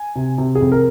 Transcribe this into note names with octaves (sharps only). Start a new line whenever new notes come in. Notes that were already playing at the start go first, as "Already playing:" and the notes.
Already playing: G#5
C3
C3
G#4
F2
A#4